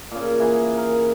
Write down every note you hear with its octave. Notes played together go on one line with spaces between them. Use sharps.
A#2 C#3
E3 A#3 G#4
A#4